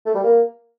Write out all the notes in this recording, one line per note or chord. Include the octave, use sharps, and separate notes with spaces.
A3
G3
A#3